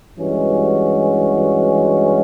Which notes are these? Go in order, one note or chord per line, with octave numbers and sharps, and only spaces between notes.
G2 E3 G#3 C#4 F#4